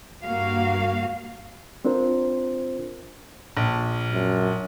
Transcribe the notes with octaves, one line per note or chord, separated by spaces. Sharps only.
G2 A#3 F#4 F5
C4 D4 F4 A#4 C5
A#1
F#2